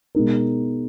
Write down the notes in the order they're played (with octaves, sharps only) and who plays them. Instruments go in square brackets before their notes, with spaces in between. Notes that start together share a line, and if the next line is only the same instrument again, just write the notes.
[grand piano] B2 G#3 D#4 A#4